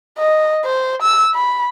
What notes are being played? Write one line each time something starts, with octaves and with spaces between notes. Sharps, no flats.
D#5
C5
E6
B5